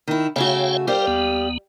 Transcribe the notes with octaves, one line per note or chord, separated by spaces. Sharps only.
D#3 E4
C#3 A3 F#4 C#5 F5 G5
G3 G4 A#4 C5 F5
D#2 B3